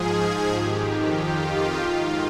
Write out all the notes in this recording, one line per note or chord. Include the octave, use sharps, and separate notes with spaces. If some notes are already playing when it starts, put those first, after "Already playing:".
Already playing: G#2 F3 G#4
F2 D#3 G4
G4
F4
G#2 D#3